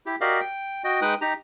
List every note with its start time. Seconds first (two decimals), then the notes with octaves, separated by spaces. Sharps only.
0.06 E4 G4
0.21 F#4 G4 A#4 D5 D#5 F5
0.40 G5
0.84 F#4 D#5 G5
1.02 G#3 D#4 B4 G5 D#6 F#6
1.21 D#4 G4 A#5